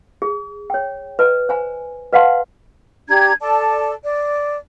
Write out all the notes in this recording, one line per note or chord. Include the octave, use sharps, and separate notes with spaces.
G#4
C#5 G5
B4 D#5 A#5
C5 G#5 A#5
B4 D#5 F5 F#5 A5 C6
D4 G4 A#5 G#6
A4 D5 A5
D5